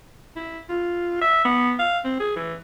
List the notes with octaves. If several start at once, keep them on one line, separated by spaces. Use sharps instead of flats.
E4
F4
E5
B3
F5
C4
G#4
E3